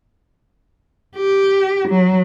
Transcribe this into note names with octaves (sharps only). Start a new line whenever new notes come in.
G4
F#3